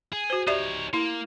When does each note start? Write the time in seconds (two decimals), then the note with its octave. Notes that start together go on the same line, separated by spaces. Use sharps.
0.13 G#4
0.30 F#4 C5
0.47 D#4 G4 C#5 D5 E5
0.93 A#3 E4